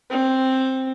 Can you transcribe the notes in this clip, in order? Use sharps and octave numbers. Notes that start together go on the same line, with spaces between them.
C4